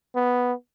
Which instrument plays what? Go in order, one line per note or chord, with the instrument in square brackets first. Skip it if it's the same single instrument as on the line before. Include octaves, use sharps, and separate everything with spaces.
[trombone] B3